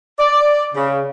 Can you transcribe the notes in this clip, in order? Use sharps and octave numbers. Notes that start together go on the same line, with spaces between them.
D5
C#3